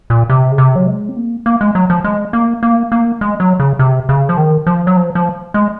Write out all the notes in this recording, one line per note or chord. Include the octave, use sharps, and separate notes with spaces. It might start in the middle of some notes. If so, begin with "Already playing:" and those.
A#2
C3
C#3
C3
F#3
G#3
C4
A#3
A#3
G#3
F#3
F3
G#3
A#3
A#3
A#3
G#3
F#3
C#3
C3
C#3
F3
D#3
F3
F#3
F3
F3
G#3